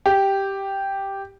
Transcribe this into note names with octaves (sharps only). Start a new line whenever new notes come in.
G4